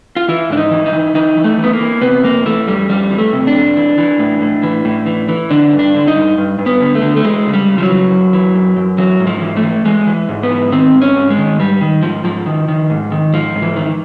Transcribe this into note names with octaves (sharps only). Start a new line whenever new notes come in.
F4
E3 E4
G#2 D4
D#4
E3
D#4
E3
E3 D#4
E3
A3
E3
B3
A#3
E3
C3 B3
F2 A#3
E3 A3
F2 G3
F2 G3
E3
A3
C3
D4
F2
E3
E3
A2
A2
E3
A2
E3
E3
D3 D4
G2
D4
D3
D#4
G2
G2
G2
B3
D3
A3
D3
A3
E3 G#3
C#3
G3
C#3
F3
F#3
E3
F#2
E3
F#2
F#2
E3 F#3
G#2
F3
E3
A3
E3
E3 G#3
E3
G#2
B3
E3
D#3 C4
G#2
C#4
G#2
G#3
D#3
G#2 G3
D#3
G#2 F3
G#2 F3
D#3
D#3
G#2
D#3
G#2 F3
G#2
E3
D#3